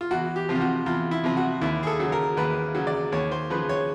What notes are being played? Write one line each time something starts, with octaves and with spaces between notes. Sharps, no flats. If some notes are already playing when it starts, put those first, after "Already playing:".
F4
E2 F#4
G4
C3 F3
F4
F#4
E2 F4
E4
C3 F3
F#4
D#2 E4
G#4
A4
C#3 F#3
A#4
D#2 B4
C#3 F#3
D5
D#2 C#5
C5
C#3 F3 B4
C#5